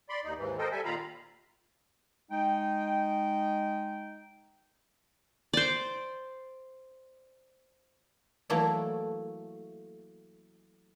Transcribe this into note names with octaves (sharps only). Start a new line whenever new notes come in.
D5 B5 C6
D#2 D#4
D#2 G#2 E3
A4 A#4 C5 D#5 G5
G3 A4 E5 G#5
A#2 D#3 F4 F5 A#5 B5
G#3 D#4 G5
C5 D5
E3 F#3 A3 A#3 A4 D5